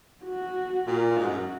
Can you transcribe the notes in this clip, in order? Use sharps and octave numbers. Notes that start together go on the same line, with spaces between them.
F#4
A#2 F4
G#2 F#4
F#2